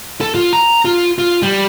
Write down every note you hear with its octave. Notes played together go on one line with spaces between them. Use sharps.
A4
F4
A#5
F4
F4
G3